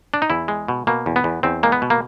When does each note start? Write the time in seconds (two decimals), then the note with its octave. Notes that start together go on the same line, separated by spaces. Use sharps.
0.14 D4
0.22 D#4
0.30 E2 E4
0.48 G#3
0.68 B2
0.87 B2 A#3
1.06 E2
1.16 B3
1.24 E2
1.43 E2 C4
1.63 G#3 A#3
1.72 B3
1.82 B2
1.90 A#3